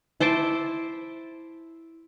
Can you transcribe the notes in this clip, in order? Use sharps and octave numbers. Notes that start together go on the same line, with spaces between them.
E4 C5 A5 D6